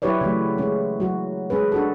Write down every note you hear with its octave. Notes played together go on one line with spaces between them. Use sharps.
F#3 E4 G4 B4 C#5 D5
C#3 E3 F#3 A3
G#3 C#4
F#3 F#4
G#3 C#4 G#4 B4
D4 F#4 A4